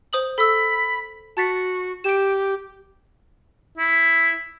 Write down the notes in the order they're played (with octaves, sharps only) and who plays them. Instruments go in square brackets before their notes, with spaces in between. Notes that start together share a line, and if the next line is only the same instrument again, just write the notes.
[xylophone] C5 D#6 F#7
[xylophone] A4 E6 [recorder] B5
[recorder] F#4 [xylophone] A5 A6 B6
[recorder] G4 [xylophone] D7 E7
[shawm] E4